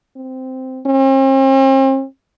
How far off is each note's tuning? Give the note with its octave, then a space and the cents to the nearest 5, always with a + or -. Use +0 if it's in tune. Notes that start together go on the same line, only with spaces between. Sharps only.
C4 -10
C4 +45